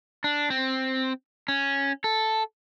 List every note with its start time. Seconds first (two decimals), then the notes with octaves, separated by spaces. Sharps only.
0.24 D4
0.50 C4
1.48 C#4
2.04 A4